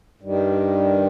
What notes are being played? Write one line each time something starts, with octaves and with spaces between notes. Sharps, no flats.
G2 D#3 G3